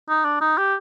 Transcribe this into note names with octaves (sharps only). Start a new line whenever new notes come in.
D#4
D4
D#4
G4